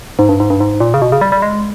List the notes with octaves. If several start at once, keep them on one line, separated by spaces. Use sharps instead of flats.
G#2
G2
G#2
G2
G#2
A#2
C#3
B2
C#3
G3
G3
G#3